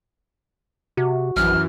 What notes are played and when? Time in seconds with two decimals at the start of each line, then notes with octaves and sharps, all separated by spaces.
0.97 C3 F#4
1.36 A#1 F#2 E3 F6